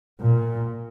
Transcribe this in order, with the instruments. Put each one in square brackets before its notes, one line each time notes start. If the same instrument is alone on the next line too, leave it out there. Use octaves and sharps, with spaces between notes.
[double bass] A#2